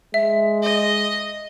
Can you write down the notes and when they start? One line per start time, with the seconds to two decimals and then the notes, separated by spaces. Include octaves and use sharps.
0.14 G#3 E5
0.63 D#5